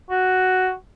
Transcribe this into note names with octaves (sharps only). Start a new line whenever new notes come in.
F#4